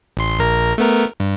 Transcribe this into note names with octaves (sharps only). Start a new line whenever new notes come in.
A1 C6
A#1 A#4 A#5
A3 B3 A#4
G2